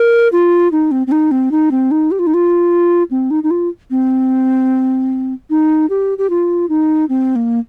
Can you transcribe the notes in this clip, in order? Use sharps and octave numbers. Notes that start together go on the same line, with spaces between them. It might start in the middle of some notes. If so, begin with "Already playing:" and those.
Already playing: A#4
F4
D#4
C4
C4
D#4
C4
D#4
C4
D#4
G4
F4
D#4
F4
C4
D#4
D#4
F4
C4
D#4
G4
G4
F4
D#4
C4
A#3